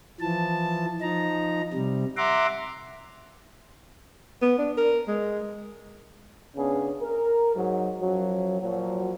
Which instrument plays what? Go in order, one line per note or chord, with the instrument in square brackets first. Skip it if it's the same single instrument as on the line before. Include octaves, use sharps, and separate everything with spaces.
[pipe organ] E3 F3 A5
F3 D#4 A#5
C3 G3
E5 F#5 A#5 C6 D6
[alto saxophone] B3
D4
A#4
G#3
[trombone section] C#3 B3 C#4 D4 G#4
A#4
G#2 F#3
F#2 F3 F#3
A#2 F3 F#3